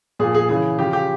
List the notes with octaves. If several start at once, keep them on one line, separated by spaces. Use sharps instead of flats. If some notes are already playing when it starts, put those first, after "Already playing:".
A#2 F3 G#4
G#4
C#3 E3 G#4
C#3 F3 G4
G4